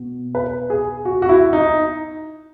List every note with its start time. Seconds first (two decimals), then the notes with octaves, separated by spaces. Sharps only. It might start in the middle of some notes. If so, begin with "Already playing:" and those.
Already playing: B2
0.35 B4
0.70 G#4
1.05 F#4
1.22 F#4
1.29 E4
1.53 D#4